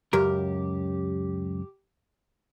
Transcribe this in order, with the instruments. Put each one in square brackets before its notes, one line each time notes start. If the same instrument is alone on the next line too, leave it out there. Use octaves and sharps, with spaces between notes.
[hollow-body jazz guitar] C#2 F#2 A#4 [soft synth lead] G4